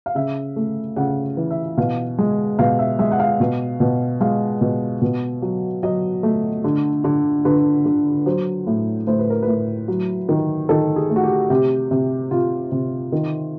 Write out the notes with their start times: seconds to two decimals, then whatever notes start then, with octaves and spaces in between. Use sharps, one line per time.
0.06 F5
0.15 C#3 E5
0.56 A3
0.96 C#3 F#5
1.37 E3
1.51 E5
1.77 B2 F5
2.18 G#3
2.59 B2 F5
2.79 E5
2.99 G#3 E5
3.11 F#5
3.20 F5
3.40 B2
3.80 B2
4.21 G#3 F5
4.61 B2
5.02 B2
5.42 F#3
5.83 F#3 D#5
6.23 A3
6.64 D3
7.04 D3
7.45 D3 B4
7.86 D3
8.26 F#3 C5
8.67 A2
9.07 A2 C5
9.19 B4
9.30 A#4
9.42 B4
9.48 A2
9.88 F#3
10.29 D#3
10.69 D#3 A4
10.96 G#4
11.10 A3
11.16 F#4
11.23 G4
11.50 C3 G4
11.91 C3
12.31 C3 F4
12.72 C3
13.12 D#3